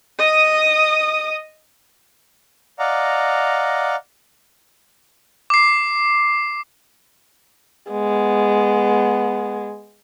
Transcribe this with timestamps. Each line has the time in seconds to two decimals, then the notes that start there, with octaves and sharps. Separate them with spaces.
0.19 D#5 D#6
2.79 D5 D#5 F5 F#5 A#5
5.50 D6 C7
7.91 G#3 B3